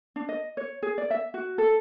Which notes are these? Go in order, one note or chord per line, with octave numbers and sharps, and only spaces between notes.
D4
D#5
C#5
G#4
D5
E5
F#4
A4